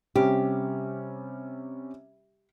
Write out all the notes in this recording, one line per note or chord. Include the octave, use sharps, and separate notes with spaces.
C3 G3 C#4 G4